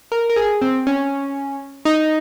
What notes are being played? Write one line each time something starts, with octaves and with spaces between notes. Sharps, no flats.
A#4
A#4
G#4
C4
C#4
D#4